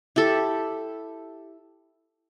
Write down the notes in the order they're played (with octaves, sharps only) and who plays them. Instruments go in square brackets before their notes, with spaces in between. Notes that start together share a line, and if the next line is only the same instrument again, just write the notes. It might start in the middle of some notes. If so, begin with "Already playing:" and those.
[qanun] E4 G4 A4